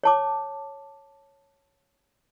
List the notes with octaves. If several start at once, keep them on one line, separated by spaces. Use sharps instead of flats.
C#5 A5 D6